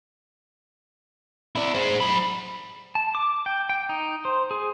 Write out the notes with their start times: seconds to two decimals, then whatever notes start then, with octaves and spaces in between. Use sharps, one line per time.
1.56 E4 D5
1.75 G#4 C5
2.00 F#3 B5
2.95 A5
3.15 D6
3.46 G5
3.69 G5
3.89 D#4
4.25 C5
4.51 G#4